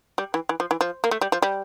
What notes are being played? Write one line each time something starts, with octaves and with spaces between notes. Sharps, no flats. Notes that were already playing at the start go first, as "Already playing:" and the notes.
G3
E3
E3
F3
E3
F3
A#3
A3
G3
F3
G3